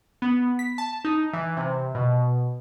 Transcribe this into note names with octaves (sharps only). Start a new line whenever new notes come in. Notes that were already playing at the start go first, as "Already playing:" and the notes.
B3
B6
A5
D#4
E3
C3
B2